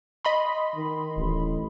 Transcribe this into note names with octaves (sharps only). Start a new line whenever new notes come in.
D#5 B5 C6
D#3
D1 A1